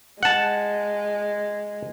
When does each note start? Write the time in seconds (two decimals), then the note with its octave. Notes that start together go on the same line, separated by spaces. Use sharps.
0.23 G#3 F#5 A5